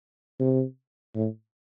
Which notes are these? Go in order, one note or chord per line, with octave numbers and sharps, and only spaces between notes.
C3
A2